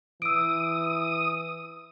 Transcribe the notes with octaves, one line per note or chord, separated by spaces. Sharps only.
E3 D#6 E6 D7